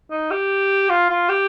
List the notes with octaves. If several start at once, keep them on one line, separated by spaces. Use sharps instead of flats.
D#4
G4
F4
F4
G4